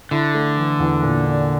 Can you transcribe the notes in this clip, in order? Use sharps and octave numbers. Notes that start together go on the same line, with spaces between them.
D3 E4
A3
E3
E2
A#2
D4